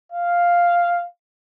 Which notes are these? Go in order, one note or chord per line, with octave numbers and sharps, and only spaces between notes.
F5